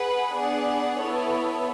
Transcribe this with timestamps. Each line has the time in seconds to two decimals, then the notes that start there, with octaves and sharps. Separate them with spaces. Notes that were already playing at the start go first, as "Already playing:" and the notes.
Already playing: G#4 B4 F#5
0.33 B3 D4 G#4 D5 F#5
0.99 B3 E4 A4 C#5